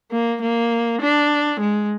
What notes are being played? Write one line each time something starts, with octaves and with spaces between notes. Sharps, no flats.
A#3
A#3
D4
G#3